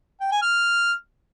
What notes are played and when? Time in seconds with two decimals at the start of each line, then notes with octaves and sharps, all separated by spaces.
0.21 G5
0.32 G#5
0.42 F6